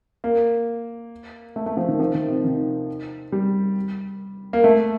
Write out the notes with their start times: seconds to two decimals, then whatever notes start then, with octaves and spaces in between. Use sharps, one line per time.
0.24 A#3
1.56 A3
1.66 A3
1.77 F3
1.88 D#3
2.00 F3
2.15 D#3
2.28 C3
2.44 D#3
3.32 G3
4.53 A#3
4.64 A3